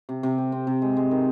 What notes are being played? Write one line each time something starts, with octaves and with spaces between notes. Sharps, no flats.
C3
C3
C4
C4
C3
G#3
G#3
D#3